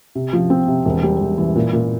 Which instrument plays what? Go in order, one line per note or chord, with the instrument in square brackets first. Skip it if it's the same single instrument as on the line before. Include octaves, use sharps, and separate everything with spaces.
[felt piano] C3
F3
C4
C3
E1
G3
E1
E3
A#2
A#2